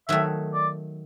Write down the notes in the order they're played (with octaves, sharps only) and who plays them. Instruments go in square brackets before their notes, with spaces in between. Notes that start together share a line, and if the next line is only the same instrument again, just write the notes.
[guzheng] D#3 F#3 A3 [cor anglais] E5
[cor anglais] D5